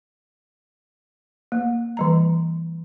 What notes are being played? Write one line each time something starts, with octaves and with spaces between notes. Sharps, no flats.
A#3
E3 G3 A#5